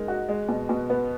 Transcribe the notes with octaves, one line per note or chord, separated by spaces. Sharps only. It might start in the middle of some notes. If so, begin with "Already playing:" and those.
Already playing: G#3 D#4 A#4
F#4
G#3
B2
B2
B3